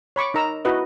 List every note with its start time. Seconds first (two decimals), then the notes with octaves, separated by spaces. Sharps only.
0.16 C#5 B5 C#6 D6
0.34 D#4 A#4 A#5 E6
0.65 E4 F#4 B4 D#5